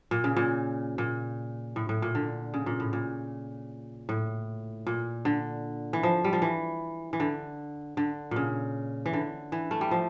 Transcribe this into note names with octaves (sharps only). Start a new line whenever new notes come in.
A#2
C#3
A#2
A#2
A2
A2
A#2
D3
C#3
A#2
A2
A#2
A2
A#2
D3
E3
F3
G3
F3
E3
E3
D3
D3
A#2 C#3
E3
D3
E3
A3
G3
F3